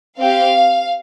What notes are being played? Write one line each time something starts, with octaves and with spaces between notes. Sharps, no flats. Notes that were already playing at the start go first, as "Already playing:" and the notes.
C4 G4 F5